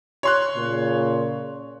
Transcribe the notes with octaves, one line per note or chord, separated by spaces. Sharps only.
C#5 C6 F#6
A#2 C#3